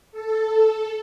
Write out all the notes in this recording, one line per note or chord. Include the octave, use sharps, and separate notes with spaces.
A4